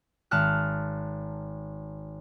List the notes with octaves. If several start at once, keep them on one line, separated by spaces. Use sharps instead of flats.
G#1 A5 F6 F#6